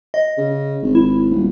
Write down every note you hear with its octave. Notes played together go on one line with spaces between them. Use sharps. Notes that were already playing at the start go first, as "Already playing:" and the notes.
D#5
C#3
G#1
E4
D#1